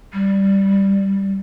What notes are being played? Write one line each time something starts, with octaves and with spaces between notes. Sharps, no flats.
G3